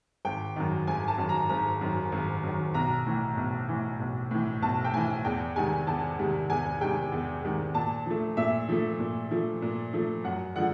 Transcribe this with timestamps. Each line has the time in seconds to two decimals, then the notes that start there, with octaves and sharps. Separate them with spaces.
0.25 G#1 G5
0.56 F#2 D#3
0.87 G#1 G#5
1.08 A5
1.18 F#2 D#3
1.29 A#5
1.49 G#1 A#5
1.81 F#2 D#3
2.12 G#1
2.43 F#2 D#3
2.74 B1 A#5
3.06 A2 E3
3.37 B1
3.69 A2 E3
3.99 B1
4.31 A2 E3
4.62 B1 A5
4.84 G5
4.93 A2 E3 G#5
5.25 E2 G5
5.56 C3 D#3 G#3 G#5
5.87 E2 A5
6.19 C3 D#3 G#3
6.50 E2 G#5
6.81 C3 D#3 G#3 G5
7.12 E2
7.44 C3 D#3 G#3
7.75 A#2 A5
8.06 F3 A3
8.37 A#2 E5
8.69 F3 A3
9.00 A#2
9.31 F3 A3
9.62 A#2
9.93 F3 A3
10.24 F#2 F#5
10.56 D3 F3 G#3 F#5